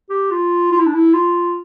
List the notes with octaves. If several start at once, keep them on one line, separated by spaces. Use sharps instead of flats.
G4
F4
F4
E4
D4
E4
F4